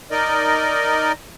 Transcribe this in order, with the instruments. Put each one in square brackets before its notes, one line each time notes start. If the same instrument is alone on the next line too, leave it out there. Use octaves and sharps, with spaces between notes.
[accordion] D#4 A#4 D5 D#5